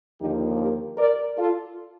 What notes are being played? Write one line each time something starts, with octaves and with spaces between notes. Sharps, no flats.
D#2 D3 F3 A#3 D#4 G4
G4 A#4
A#4 D5
F4 A4